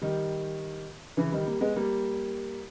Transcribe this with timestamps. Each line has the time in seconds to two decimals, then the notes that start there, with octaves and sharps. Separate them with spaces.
0.02 D#3 G3
1.17 C#3 E3
1.32 D#3 G3
1.46 G3 A#3
1.61 G#3 B3
1.76 G3 A#3